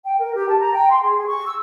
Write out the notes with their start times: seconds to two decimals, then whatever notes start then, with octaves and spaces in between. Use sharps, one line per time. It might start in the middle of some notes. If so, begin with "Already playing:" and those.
0.05 G5
0.19 A#4
0.33 G4
0.47 A5
0.60 A#5
0.73 G5
0.90 C6
1.03 G#4
1.16 G#4
1.28 C#6
1.46 E6